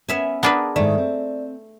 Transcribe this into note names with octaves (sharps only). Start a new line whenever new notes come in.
B3 C#4 E5 G#5
B3 D4 G#4 A#4 B4 A5
G#2 D#3 A3 D5
C4